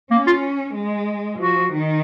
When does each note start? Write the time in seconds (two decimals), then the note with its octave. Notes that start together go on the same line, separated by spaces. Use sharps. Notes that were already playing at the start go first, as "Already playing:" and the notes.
0.11 A#3 C#4
0.27 F4
0.75 G#3
1.39 F3 F#4
1.73 D#3